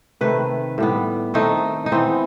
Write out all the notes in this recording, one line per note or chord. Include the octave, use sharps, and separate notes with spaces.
C3 D#3 A3 B4
A2 G3 B3
D#3 A3 C4 D#4
D#4
E3 B3 C4